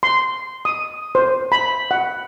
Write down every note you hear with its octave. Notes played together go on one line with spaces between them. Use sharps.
C6
D#6
C5
B5
F#5